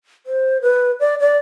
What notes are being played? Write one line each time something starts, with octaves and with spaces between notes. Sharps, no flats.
C5
B4
D5
D5